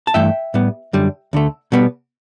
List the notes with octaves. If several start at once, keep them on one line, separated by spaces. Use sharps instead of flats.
A5
G2 E3 A3 E5 G5
A2 G3 B3
F#2 D3 G3
D2 D3 A3
B2 G3 B3